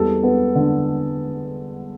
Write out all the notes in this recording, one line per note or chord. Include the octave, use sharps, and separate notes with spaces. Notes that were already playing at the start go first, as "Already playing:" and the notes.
Already playing: E2 G3 A4
B3
D3